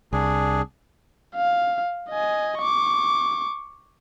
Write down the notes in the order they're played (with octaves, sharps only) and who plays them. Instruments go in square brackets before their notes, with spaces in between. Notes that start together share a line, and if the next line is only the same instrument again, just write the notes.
[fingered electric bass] C2 [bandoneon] D4 G#4
[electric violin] F5
D#5 G#5
C#6 D6